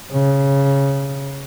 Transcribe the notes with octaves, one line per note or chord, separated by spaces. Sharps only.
C#3